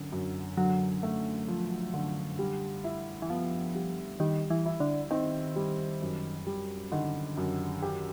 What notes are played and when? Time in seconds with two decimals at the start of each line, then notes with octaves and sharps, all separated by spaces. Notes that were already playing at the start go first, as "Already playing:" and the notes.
Already playing: F#2 D3
0.12 F#2
0.57 D3 F#3
1.03 A3
1.48 F3
1.94 D3
2.39 G3
2.84 E4
3.22 E3
3.30 F3 B3
3.75 G3
4.20 D#3 G3
4.50 E3
4.66 E4
4.80 D3
5.11 D#3 C4
5.56 G3
6.02 F#2
6.46 G3
6.92 D3 D#3
7.37 F#2
7.82 G4